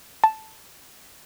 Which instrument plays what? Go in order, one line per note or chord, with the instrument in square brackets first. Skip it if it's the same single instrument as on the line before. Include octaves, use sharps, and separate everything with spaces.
[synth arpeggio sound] A5